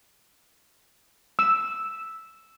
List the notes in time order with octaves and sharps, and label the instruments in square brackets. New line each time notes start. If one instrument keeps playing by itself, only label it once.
[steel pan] E6